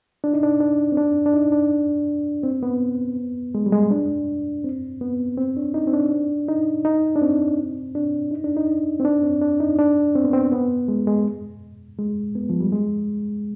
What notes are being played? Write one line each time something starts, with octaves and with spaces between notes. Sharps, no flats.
D4
D#4
D4
D4
C4
D4
D4
D#4
D4
C4
B3
G#3
G3
G#3
D4
C4
B3
C4
D4
D#4
C4
D4
D#4
D#4
D4
C4
D4
D#4
D4
D#4
C4
D4
C4
D4
D#4
D4
C4
B3
C4
B3
G#3
G#3
G#3
B3
F3
G3
G#3